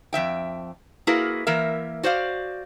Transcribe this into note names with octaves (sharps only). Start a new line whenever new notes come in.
F2 G#2 E5 G5
A#3 E4 F#4 G#4 A#4 B4
E3 A#3 A#4 E5
F#4 C5 D5 F5